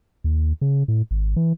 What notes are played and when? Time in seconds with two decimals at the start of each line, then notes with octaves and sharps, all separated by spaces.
0.24 D#2
0.61 C#3
0.88 A2
1.11 G#1
1.36 E3